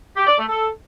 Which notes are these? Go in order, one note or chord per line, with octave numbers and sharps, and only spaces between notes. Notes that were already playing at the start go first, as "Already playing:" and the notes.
G4
D5
A3
A4